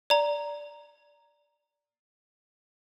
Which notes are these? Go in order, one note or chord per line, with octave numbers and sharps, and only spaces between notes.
D5 A#5